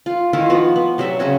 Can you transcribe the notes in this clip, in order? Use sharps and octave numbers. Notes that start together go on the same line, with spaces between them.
F4
D#3 E4 F4
F3 B3 F#4
B3
C3 F#3 D4 E5
C#3 C#4 F#4 C#5